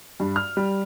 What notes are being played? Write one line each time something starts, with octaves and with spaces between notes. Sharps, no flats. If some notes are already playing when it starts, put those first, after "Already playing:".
G2
F6
G3